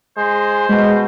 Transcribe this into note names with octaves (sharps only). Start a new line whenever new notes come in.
G#3 C5
B2 G#3